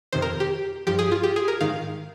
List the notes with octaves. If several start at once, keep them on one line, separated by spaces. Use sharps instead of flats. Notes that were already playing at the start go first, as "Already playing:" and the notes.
F2 C3 D#3 C5
A#4
G4
G2 F3 G4
G#4
F4
G4
G#4
A#4
G#2 D#3 F5